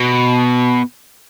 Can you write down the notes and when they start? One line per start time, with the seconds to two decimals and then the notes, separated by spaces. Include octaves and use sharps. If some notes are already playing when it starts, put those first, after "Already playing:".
Already playing: B2